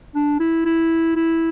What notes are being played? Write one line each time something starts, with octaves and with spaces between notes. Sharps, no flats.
D4
E4
E4
E4